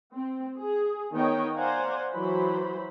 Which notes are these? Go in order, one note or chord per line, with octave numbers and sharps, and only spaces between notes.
C4
G#4
D#3 B3 C#5 D#5 G5
C5 D5 F5 F#5 G#5 A#5
E3 F#3 C5 B5